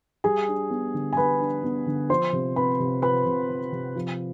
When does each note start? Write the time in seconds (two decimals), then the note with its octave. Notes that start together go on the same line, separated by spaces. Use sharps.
0.24 G3 G#4 G#5
0.48 D4
0.70 B3
0.94 D3
1.13 G#5
1.17 G3 B4 B5
1.40 D4
1.64 B3
1.86 D3
2.10 F3 C5 C6
2.33 C3
2.56 C4 B4 B5
2.80 C3
3.02 F3 B4 B5
3.26 C3
3.49 C4
3.72 C3
3.95 F3